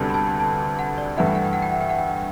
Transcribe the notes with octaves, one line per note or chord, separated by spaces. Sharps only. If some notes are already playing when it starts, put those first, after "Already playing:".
Already playing: D2 C3 G3 B3 D4 A5
B5
A5
A5
F#5
D5
G2 E3 A3 E4 F#5
G5
F#5
G5
F#5
G5
F#5
G5
F#5
G5
F#5
G5